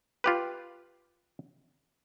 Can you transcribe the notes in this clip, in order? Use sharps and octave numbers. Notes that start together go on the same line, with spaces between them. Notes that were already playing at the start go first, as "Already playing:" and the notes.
F4 G4 B4